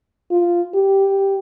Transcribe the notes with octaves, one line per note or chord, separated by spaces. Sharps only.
F4
G4